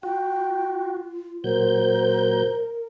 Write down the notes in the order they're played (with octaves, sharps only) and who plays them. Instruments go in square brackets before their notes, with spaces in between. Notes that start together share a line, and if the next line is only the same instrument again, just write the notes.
[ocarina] F4 [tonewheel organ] F#4 [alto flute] G5
[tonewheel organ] A#2 F#3 G6 [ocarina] A#4 [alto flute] C5